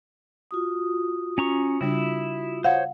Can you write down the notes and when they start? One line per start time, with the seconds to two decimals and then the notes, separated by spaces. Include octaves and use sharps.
0.51 F4 F#4 D#6
1.38 C#4 A#5 C#6
1.81 C#3 G3 D4 E4
2.64 C5 C#5 F5 F#5